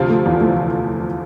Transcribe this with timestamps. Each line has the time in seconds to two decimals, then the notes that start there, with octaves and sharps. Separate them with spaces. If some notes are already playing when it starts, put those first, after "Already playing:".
Already playing: D2 C3 F3 F4
0.09 A3
0.26 E2
0.41 A3